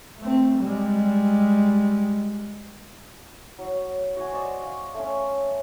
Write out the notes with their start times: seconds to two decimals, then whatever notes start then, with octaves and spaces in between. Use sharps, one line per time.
0.19 A3 C4
0.59 G3 G#3
3.59 F#3
4.17 F#4 F#5 G#5
4.33 C5 D5 D#5 C#6
4.63 F5
4.94 A3 C#4